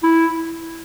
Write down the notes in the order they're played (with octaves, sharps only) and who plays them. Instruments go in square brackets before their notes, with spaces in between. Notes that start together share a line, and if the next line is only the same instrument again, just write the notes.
[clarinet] E4